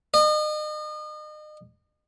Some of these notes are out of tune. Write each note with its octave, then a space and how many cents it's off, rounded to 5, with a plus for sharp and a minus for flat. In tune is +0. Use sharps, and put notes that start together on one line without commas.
D#5 -35